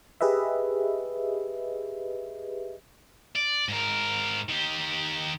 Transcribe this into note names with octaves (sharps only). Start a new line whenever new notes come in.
G4 G#4 B4 D#5 E5
D5
G#2 A#4
D#3 G4